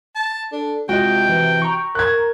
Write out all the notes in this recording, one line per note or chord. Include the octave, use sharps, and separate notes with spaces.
A5
D4 A4
C3 G#3 F4 F#4 D#5 G5
E3
A#5 C#6
A#4 F#6 G#6